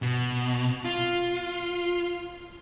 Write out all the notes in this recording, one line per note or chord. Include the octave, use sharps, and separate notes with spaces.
B2
F4